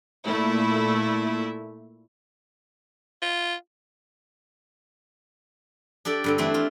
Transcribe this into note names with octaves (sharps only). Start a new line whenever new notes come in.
A#2 A3 E4
F4
D4 G4 A4 D5
G2 D3 C4
E3 A3 C4 D4
F4